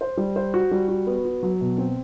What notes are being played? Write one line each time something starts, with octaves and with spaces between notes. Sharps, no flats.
C5
G3
C5
F#4
G3
F#4
B3
F#4
F#3
B2
C4